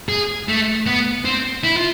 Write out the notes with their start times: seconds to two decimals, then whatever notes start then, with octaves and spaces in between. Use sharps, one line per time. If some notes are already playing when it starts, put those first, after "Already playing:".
0.09 G#4
0.48 A3
0.86 B3
1.25 C4
1.64 E4
1.76 F4